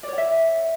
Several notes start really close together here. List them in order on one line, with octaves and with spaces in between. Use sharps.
D5 C#5 F#5 E5